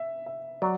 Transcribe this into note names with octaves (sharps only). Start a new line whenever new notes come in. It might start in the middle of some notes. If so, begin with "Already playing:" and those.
Already playing: E5
E5
F#3 D5